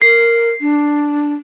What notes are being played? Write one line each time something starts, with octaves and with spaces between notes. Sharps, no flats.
A#4 C7
D4